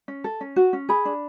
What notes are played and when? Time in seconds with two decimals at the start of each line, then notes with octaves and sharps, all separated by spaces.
0.08 C#4
0.24 A4
0.41 C#4
0.56 F#4
0.73 C#4
0.89 G#4 B5
1.05 D4